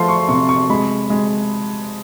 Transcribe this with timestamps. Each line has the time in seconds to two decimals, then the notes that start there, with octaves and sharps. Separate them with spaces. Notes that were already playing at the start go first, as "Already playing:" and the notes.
Already playing: F3 A3 C6
0.09 C#6
0.29 C3 C#6
0.49 C#6
0.70 G#3 B5
1.10 G#3